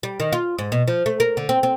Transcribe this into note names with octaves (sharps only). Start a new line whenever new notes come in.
G3
D#3
F4
G#2
B2
F3
A3
A#4
D3
C4
C4